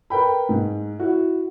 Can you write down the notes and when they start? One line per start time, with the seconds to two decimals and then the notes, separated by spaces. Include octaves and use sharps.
0.10 A#4 B4 G5 B5
0.49 G#2
0.99 E4 F#4